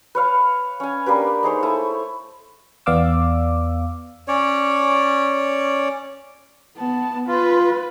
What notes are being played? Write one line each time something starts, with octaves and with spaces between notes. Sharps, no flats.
B4 C#5 F5
C#4 G#5
A#3 D4 G4 B4
D#4 G#4 C5 C#5
A3 E4
E2 B3 D5 F5 D6 E6
C#4 C#5 D5
B3 A5
F4 B4